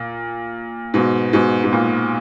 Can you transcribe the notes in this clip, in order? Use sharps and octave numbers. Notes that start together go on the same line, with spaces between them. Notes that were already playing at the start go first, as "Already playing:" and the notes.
Already playing: A#2
G#2 B2
G#2 B2
G#2
A#2